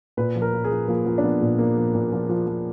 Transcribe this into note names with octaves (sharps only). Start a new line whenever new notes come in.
A#2 B4
F3
A#4
F3
G#4
F3
F3 A#3
F3
D4
F3 B3
A#2
F3 A#3
F3
A#2
F3
F3
F3